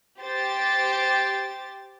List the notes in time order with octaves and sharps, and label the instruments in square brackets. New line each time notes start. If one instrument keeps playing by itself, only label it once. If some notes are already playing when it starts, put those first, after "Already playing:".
[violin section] G4 C5 A6